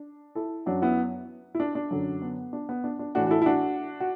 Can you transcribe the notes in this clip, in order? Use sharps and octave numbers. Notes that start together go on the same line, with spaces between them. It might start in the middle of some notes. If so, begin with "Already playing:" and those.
Already playing: D4
E4 A4
F#2 F#3 D4 F#4
B3 E4
E4
D4
D4
F#2 D3 F#3
B3
D4
B3
D4
D4
A2 E3 D4 F#4
F#4
E4 A4
E4
D4 F#4
F#4